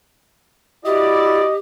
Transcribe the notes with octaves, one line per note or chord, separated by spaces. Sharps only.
E4 F#4 G4 D5 D#5